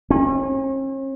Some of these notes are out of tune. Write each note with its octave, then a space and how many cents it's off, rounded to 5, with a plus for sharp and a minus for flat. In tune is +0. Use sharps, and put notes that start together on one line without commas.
C#4 -45